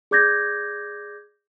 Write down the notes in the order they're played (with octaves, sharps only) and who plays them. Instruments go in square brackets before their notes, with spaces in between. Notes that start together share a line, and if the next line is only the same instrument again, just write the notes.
[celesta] G#4 D5 D6 G6 G#6 A#6